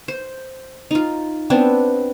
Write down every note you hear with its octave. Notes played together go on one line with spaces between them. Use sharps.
C5
D#4 F4
B3 C4 D4